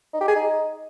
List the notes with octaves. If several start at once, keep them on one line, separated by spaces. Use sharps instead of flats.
D#4
G4
G#4
D#4